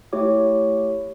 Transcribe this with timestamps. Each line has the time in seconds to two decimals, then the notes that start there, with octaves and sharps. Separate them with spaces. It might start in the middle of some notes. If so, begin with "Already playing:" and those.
0.13 A3 E4 G4 C#5 D6